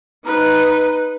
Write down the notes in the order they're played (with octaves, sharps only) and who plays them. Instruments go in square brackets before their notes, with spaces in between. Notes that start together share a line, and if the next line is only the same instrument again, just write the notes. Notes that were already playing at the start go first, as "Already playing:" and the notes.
[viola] D#4 B4